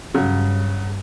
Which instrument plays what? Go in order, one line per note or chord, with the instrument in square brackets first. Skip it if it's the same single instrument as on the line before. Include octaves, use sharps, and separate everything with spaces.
[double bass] G2 [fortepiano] C#3 F#3